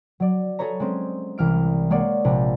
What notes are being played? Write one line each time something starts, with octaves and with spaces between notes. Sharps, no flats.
F#3 D5
G#4 A4 B4 C#5 A#5
G#3 C4 C#4
C2 E3 F6 D7
G#3 A#3 C#5 D5 F#5
A#1 C3